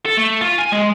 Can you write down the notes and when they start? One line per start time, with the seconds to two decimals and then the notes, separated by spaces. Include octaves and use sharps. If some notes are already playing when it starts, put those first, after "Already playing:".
0.05 A4
0.17 A3
0.41 F4
0.59 G#5
0.73 G#3